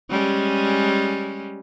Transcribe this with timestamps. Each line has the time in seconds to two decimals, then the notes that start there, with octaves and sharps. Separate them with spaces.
0.10 G3 G#3 C#4